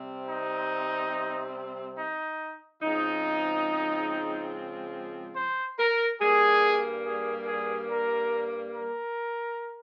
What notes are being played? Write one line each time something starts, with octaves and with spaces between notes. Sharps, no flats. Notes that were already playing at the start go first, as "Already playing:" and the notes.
Already playing: C3 G3 C4
D#4
D#4
C#3 F3 G#3 C4 D#4
C5
A#4
G2 G3 A#3 G#4
G#4
G#4
A#4
A#4